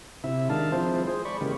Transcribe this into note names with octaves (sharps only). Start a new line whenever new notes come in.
C3 E4 E5
D#3 G#3 D4 F5 A5
F3 G#3 C4 E4 C5
G#4 C5
D5 B5 C#6
C#3 E3 G#3 A#3 G4